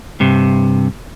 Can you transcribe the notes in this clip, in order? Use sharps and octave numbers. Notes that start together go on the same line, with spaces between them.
G2 C3